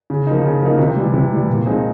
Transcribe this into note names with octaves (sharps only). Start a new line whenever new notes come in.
C#3
F3 A#3 D#4
C#3
F3 A#3 D#4
C3
E3 G3
C3
E3 G3
A#2
F3 G#3 C4 D#4